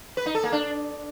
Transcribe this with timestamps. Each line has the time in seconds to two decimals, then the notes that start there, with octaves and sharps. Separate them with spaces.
0.17 B4
0.26 D#4
0.35 A4
0.44 A#3
0.52 D4